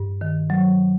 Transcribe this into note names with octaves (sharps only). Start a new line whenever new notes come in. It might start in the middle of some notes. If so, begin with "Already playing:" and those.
Already playing: G2
D#3
F#3